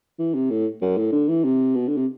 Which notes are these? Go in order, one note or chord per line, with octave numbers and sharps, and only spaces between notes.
E3
C3
A2
F#2
A2
D3
E3
C3
B2
D3
C3